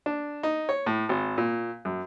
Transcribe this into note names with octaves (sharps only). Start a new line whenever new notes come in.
D4
D#4
C#5
A2
G#1
A#2
F#2